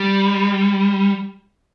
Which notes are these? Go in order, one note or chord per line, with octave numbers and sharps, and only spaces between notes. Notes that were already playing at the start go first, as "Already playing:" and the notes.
Already playing: G3